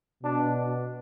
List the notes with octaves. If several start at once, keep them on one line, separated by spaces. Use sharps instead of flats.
B2 D4